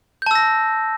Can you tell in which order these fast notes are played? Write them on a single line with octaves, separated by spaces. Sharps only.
G6 A5 E6 A#6